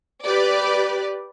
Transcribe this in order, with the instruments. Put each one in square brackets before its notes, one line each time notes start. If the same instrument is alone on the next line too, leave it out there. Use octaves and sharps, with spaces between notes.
[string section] G4 B4 D5